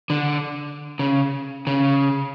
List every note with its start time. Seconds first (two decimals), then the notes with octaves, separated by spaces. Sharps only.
0.10 D3
0.99 C#3
1.67 C#3